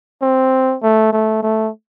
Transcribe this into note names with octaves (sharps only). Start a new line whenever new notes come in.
C4
A3
A3
A3